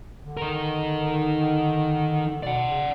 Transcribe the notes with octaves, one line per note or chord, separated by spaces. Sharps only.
D3
D#3 A#4
B2 D5 F#5
C#3